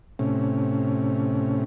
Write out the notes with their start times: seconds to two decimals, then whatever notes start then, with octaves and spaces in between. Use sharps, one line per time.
0.19 A2 C3 C#4